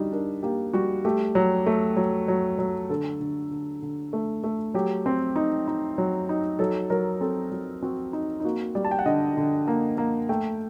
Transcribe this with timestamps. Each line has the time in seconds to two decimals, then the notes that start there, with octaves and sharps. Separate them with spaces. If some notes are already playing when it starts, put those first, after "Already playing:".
Already playing: D3 G3 D#4 F#4
0.12 D4 A#4
0.43 A#3 G4
0.73 G3 F#4
1.05 A3 G4
1.35 F#3
1.66 A3
1.97 F#3
2.28 F#3
2.59 F#3
2.90 D3 A4
3.20 D3
3.51 D3
3.82 D3
4.13 A3
4.44 A3
4.74 F#3 G4
5.06 C4
5.36 D#4
5.68 D#4
5.98 F#3
6.29 D#4
6.59 F#3 A4
6.90 F#3 A#4
7.21 C4 A4
7.52 F#3
7.83 C4 F#4
8.13 D#4
8.40 D#4
8.44 A#3 F#4
8.75 G3 D5
8.85 A5
8.91 G5
8.99 F#5
9.06 D3 D#5
9.37 D3
9.68 A#3
9.98 A#3
10.29 A3 G5